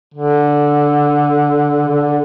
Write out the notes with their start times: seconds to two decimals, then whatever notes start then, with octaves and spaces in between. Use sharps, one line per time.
0.14 D3
1.88 D3